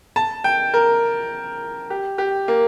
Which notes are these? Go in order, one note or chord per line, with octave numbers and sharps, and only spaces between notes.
A5
G5
A#4
G4
G4
A#3